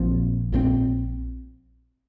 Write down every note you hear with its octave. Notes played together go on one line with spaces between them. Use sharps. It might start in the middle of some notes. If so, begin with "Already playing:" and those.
Already playing: A#1 A#2 F3 C4
A#1 A#2 F3 C4